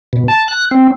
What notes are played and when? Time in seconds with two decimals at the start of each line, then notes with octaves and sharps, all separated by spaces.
0.13 B2
0.28 A5
0.48 F#6
0.71 C4